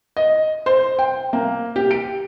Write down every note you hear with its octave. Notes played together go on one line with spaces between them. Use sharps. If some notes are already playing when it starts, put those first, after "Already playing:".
D#5
C5
G5
A#3
G4
D7